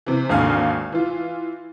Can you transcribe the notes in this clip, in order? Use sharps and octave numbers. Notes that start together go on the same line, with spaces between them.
C3 E3
G#1 D#2 D3 F5 G#5 F6
E3 F4